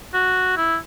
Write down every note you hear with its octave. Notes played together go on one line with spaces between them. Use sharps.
F#4
E4